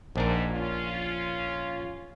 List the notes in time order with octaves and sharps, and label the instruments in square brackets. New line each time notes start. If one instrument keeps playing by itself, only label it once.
[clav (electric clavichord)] A#1 D4 A#4 [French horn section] G#2
[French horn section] C#4 F4